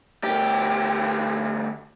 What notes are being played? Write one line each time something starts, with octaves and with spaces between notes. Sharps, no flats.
D2 G4